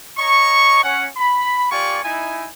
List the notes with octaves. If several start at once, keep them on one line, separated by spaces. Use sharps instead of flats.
C#5 D#5 A#5 C#6
C#4 F#5
B5
A#3 F4 G4 D5 G#5 C#6
D#4 E4 G#5